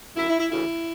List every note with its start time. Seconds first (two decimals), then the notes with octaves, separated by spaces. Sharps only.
0.16 F#2 D3 E4
0.29 E4
0.39 E4
0.51 D2 C#3 E3 E4